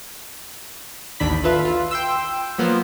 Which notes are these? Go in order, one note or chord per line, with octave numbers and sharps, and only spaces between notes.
A1 D#2 D#3 D4 B5 B6
F4 A4 B4 E5
F4
G5 C6 E6
F3 F#3 A#3 B3 C5